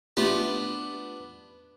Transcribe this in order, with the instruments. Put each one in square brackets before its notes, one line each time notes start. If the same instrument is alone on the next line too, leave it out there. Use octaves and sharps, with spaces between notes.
[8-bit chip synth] A3 F4 G4 [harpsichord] B3 D4